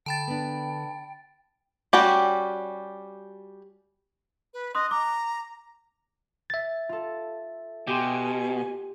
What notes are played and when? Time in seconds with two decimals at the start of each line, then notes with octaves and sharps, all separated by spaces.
0.06 D3 G5 A5 B5 A6
0.27 B3 D4
1.93 G3 C#4 F#4 G4
4.54 B4
4.75 D#5 C6 D#6 F#6
4.91 A#5 D6
6.50 E5 G#6 A6
6.89 F4 A4
7.87 B2 G4 G#5 C6